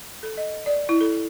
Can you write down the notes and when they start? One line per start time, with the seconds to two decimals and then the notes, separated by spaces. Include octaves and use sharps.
0.23 A4
0.37 D#5
0.66 D5
0.89 E4
1.01 A4